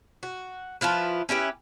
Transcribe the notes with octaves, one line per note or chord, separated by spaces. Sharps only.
F#4
F3 E4 F4 B4
C#4 E4 G4 B4